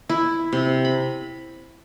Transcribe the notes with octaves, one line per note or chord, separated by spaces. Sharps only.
E4
C3
B5